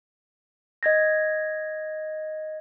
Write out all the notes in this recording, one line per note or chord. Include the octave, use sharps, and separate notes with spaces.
D#5 G#6 A#6